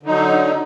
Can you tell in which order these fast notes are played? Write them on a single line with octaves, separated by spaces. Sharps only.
D3 D#4 F#3